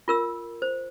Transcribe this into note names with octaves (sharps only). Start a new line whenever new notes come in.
F4 A#4 E6
C5